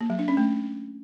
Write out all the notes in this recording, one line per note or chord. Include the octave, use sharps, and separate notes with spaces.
A#3
F#3
D4
C#4
A3